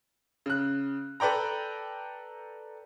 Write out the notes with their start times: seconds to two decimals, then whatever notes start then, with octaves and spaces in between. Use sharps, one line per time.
0.46 C#3 F#6
1.20 A4 B4 D5 G5 A#5